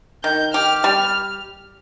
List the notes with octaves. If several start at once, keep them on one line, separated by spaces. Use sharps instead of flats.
D#3 G6
G4 F6
G3 F6